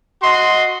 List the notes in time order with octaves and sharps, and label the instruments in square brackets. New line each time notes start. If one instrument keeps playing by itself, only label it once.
[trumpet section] F#4 D#5 C6